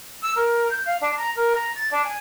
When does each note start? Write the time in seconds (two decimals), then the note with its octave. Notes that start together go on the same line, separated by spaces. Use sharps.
0.22 E6
0.36 A#4
0.70 G6
0.86 F5
1.01 D4
1.17 A#5
1.36 A#4
1.55 A#5
1.75 A6
1.91 D4
2.04 G#5